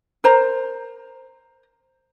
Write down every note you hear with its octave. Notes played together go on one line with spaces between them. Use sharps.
A#4 C5 A#5